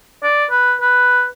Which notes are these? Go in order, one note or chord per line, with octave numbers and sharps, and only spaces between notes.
D5
B4
B4